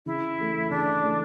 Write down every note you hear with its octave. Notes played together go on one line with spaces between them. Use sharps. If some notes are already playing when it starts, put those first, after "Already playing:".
C#3 E4
E3 A3
C#3 D4
E3 A3